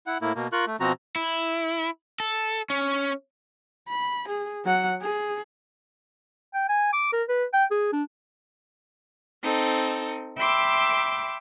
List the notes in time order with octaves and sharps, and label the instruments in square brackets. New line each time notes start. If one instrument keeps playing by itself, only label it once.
[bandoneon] E4 F#5
A2 A#3 E4
B2 A#3
F4 A#4 C#6 F#6
A3
B2 F3 C4 F#4 A#5
[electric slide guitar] E4
A4
C#4
[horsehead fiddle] B5
G#4
F#3 F#5
G#4
[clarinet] G5
G#5
D6
A#4
B4
G5
G#4
D4
[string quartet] C4 D#4 A4
E5 G5 B5 C6 D6 E6